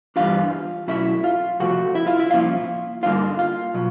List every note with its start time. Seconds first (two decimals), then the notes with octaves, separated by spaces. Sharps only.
0.16 G2 E3 G3 B3 D4 F4 F5
0.88 B2 F#3 A3 C#4 E4 E5
1.24 F4 F5
1.60 C3 F3 A3 F#4 F#5
1.95 E4 E5
2.07 F4 F5
2.19 E4 E5
2.31 C2 A#2 F3 A#3 C#4 F4 F5
3.03 G2 D3 G3 A#3 D#4 F4 F5
3.39 F4 F5
3.74 B2 F#3